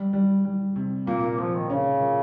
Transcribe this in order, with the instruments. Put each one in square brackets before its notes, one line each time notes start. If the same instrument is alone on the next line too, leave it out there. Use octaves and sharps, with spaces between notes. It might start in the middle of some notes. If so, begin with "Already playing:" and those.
Already playing: [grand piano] G3
G3
G3
C3
[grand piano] A#2 [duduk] A#3
[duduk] A#3
[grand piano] A#2 [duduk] F3
[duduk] D#3
[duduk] C#3 [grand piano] C#4
[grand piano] A#2